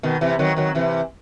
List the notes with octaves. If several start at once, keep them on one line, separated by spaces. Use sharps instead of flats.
B2 D#3
C3 E3
D#3 F#3
D#3 F#3
C3 E3